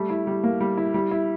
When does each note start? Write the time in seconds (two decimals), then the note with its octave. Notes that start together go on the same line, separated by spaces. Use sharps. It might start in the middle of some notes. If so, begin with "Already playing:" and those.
Already playing: G3 A3
0.10 E4
0.27 G3
0.43 A#3
0.61 G3
0.77 E4
0.94 G3
1.11 E4